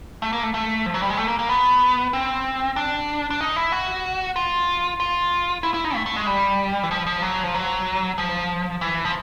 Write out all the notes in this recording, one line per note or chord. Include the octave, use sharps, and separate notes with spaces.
A3
A#3
A3
A3
F3
F#3
G3
G#3
A3
A#3
A#3
B3
C4
D4
D4
D#4
E4
F#4
F4
F4
E4
E4
D#4
A3
A3
G#3
G3
E3
F3
F3
F#3
F3
F#3
F3
E3
F3